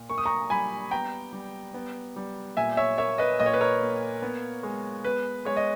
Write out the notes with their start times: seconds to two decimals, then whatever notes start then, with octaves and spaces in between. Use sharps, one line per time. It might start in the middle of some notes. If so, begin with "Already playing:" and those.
Already playing: A#2
0.09 A#3 C#6
0.18 D#6
0.26 A#5 C#6
0.50 G3 G#5 B5
0.91 B3 G5 A#5
1.33 G3
1.74 B3
2.16 G3
2.57 A#2 E5 G#5
2.77 C#5 E5
2.98 A#3 C#5 E5
3.18 B4 D#5
3.40 A#2 D#5
3.46 C#5
3.54 B4
3.61 A#4 C#5
3.81 A#3
4.22 B3
4.63 G#3
5.05 B3 B4
5.45 G#3 C#5
5.57 D#5